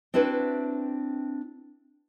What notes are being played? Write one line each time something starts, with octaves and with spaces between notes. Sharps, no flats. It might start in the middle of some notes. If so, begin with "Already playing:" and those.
C4 D4 E4 F#4 B4